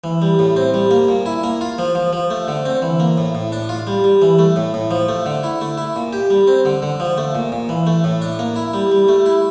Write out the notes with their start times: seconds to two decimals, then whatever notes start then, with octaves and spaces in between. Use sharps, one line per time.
0.04 E3
0.22 G3
0.39 A2
0.57 C4
0.74 G3
0.91 A#3
1.08 A#2
1.26 E4
1.44 A#3
1.61 F4
1.78 F3
1.95 F3
2.13 F3
2.30 A3
2.48 D3
2.65 C4
2.82 E3
3.00 A#3
3.18 A2
3.35 A2
3.52 D4
3.69 F4
3.87 G3
4.04 G3
4.22 E3
4.39 A3
4.56 A2
4.74 A2
4.91 F3
5.09 A3
5.26 D3
5.44 E4
5.61 A3
5.78 E4
5.96 A#2
6.13 G4
6.30 G3
6.48 C4
6.65 D3
6.82 D3
7.00 F3
7.18 A3
7.35 A#2
7.52 A#2
7.69 E3
7.87 A3
8.04 A2
8.22 D4
8.39 A#3
8.56 E4
8.74 G3
8.92 G3
9.08 A3
9.26 E4